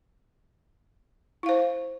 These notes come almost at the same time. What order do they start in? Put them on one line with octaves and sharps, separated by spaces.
E4 F5 C5